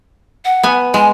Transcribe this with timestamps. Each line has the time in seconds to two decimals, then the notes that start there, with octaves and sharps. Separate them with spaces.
0.45 F#5
0.63 B3 G#5
0.94 G#3 G#5